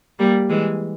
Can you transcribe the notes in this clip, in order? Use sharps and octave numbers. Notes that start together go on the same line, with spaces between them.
G3 A#3
E3 G#3